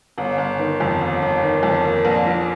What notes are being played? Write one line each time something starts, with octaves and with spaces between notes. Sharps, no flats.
G1
G1
D#3
F2
G1
G1
D#3
F2
A#3
A#1
F3